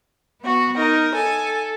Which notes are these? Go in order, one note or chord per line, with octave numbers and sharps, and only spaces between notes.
B3 F#4
D#4 A#4
A4 G#5